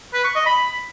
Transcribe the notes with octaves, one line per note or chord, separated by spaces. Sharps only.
B4
C#6
D#5
B5